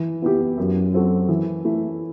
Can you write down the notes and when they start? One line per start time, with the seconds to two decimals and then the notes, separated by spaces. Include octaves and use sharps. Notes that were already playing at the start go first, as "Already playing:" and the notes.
Already playing: E3
0.22 B3 E4 G4
0.57 F#2
0.93 F#3 C4 F#4 A4
1.29 E3
1.65 A3 E4